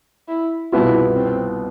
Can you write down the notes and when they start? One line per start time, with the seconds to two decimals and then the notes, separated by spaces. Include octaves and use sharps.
0.28 E4
0.72 C2 B2 B3 E4 F4
1.16 C4